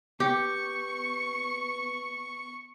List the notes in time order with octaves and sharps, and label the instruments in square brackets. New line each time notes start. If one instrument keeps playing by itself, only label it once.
[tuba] B3 [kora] G4 [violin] C#6 C#7